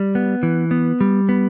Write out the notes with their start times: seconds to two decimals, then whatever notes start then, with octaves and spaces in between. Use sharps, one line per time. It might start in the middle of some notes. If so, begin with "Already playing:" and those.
Already playing: G3
0.15 B3
0.43 E3
0.71 B3
1.01 G3
1.29 B3